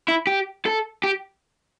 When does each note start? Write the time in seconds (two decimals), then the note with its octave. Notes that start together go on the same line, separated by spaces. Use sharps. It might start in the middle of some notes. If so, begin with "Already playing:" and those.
0.09 E4
0.27 G4
0.66 A4
1.04 G4